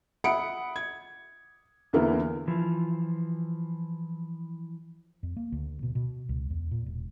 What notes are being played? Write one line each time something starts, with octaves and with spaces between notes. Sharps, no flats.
E5 F#5 B5 D#6 C#7 D7
G#6
E2 D3 E3 A#3 B3 E4
E3 F3
F2
A#3
D2
B2
B2
C#2
E2
A#2
E1